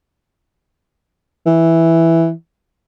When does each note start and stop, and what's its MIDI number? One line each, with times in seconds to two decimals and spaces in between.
1.46 2.31 52